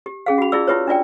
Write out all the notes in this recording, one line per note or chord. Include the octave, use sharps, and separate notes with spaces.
G4
C#4 G#4 F5
F#4 B5
E4 F4 G#4 D5 E6
E4 F4 G4 B4 C#5
D4 F4 D5 G5